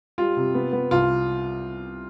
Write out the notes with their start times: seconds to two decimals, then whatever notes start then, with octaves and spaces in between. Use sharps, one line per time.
0.18 G3 F4
0.36 C3
0.55 B3
0.72 B3
0.91 C2 F4